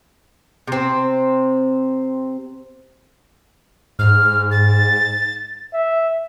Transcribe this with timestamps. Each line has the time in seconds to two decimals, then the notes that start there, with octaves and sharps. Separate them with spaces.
0.68 C3 C4
3.99 G#2 F6
4.51 A6
5.73 E5